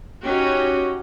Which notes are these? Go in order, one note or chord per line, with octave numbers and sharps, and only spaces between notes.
C#4 D#4 F#4 G4